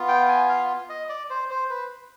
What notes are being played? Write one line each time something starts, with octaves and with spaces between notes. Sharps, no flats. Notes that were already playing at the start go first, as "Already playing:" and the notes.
Already playing: B3 F4
G5
G#5
F5
D#5
D5
C5
C5
B4